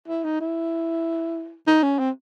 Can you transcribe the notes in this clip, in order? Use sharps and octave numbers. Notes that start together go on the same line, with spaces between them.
E4
D#4
E4
D#4
C#4
C4